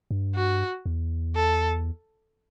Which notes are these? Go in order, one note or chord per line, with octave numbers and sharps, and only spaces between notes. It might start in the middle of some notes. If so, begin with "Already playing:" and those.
G2
F#4
E2
A4